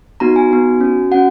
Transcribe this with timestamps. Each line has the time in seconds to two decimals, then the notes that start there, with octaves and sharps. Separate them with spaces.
0.20 B3 D#4 F#4 A#5
0.36 G#5
0.51 B3 D#4 F#4
0.81 C#4 F#4
1.11 C#4 F#4 F#5